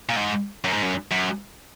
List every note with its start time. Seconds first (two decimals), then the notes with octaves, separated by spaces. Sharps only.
0.09 A#2
0.16 G#2
0.64 F#2
0.73 G#2
0.83 F#2
1.11 F#2